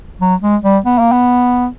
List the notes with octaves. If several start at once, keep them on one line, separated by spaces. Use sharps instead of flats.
F#3
G#3
G3
B3
A#3
B3